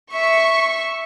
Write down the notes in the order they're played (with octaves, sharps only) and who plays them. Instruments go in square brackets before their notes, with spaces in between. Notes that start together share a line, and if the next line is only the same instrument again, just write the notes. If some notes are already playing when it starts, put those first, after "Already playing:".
[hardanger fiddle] E5 [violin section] C#6